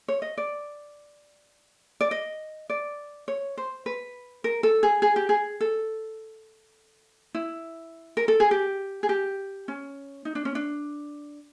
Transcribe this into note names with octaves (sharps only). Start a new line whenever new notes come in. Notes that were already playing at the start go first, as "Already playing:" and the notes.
C#5
D#5
D5
D5
D#5
D5
C#5
C5
B4
A#4
A4
G#4
G#4
G4
G#4
A4
E4
A#4
A4
G#4
G4
G#4
G4
C#4
D#4
D4
C#4
D4